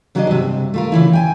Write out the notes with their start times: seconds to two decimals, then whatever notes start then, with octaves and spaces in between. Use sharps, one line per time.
0.15 C#3 F#3 A#3 D4 G#4 D#5
0.27 G2 C3
0.74 A3 F4 A#4
0.92 C#3 E3 E4
1.13 G5 G#5